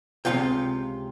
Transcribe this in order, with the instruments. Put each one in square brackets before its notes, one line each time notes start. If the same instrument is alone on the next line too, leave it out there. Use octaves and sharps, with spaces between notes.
[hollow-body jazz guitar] C#2 C3 F3 C#4 F4 G5